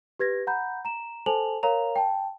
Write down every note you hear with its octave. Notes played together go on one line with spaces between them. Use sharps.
G4 B4 G#6 A#6
F#5 A#5 B5 G6
A#5 E7
A4 C5 G#5 A5 F7 F#7
A#4 C#5 F5 A#5 F7
G5 A5